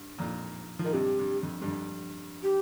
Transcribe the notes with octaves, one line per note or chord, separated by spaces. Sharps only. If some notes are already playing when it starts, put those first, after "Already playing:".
Already playing: G2
F2 A#2
F3
D#3 A#4
G2 C3 G4
G2
F2
G2
F2
G4